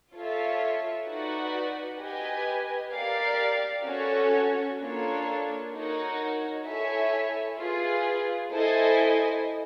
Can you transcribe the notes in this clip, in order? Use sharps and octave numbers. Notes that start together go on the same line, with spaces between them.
F4 A4 C#5 E5
D#4 F#4 B4 D5 F#5
G4 B4 D#5 G#5
G4 A#4 D5 F5
C#4 F#4 A4 C#5
A#3 D4 F4 A4 C#5
D#4 F#4 A#4 C#5
E4 A4 C#5 E5 G#5
F4 G#4 B4
E4 A4 C5 D#5 G#5